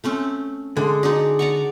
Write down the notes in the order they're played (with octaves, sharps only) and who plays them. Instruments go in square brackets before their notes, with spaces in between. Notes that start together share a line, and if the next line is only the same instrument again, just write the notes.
[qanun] A3 C4 C#4
[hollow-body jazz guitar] D3 [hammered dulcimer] G#3 C6
[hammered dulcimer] D4 D5 [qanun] D#4 F#4 G#4
[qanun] D5 A#5 C#6 [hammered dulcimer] F#5